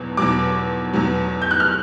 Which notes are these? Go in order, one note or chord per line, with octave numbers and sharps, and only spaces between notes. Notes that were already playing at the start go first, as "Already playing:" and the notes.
Already playing: E2 B2 F#3
E2 B2 F#3 D6
E2 B2 F#3
G6
F#6
F6